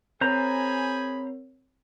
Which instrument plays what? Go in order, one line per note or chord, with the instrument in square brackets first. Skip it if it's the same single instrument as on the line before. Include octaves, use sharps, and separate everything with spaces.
[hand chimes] C4 A#4 C#5 [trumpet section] G#4 G#5 B5 [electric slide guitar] C5 A#5